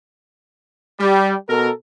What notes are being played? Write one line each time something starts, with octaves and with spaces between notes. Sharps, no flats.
G3
B2 A4 A#4